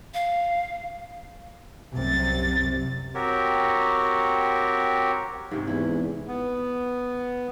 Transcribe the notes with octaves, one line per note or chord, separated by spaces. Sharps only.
F5
C2 F#2 C3 A6
C4 F#4 G4 A#4 C#5
G#2 C3 C#4
E2 E4
B3